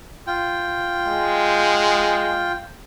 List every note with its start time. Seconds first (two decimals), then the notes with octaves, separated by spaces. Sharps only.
0.27 F4 G5
1.08 G#3